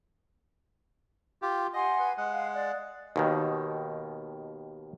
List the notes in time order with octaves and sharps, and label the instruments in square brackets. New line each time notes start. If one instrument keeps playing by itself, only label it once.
[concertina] F4 G4
[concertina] D#5 [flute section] F#5 G#5 C6
[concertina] B4
G#3 F#5
[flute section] F5
D5
[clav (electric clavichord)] D#2 B2 D#3